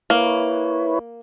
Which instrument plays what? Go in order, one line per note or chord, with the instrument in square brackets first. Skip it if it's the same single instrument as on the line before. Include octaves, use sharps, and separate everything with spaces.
[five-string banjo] A#3 [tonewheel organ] E4 B4 C#5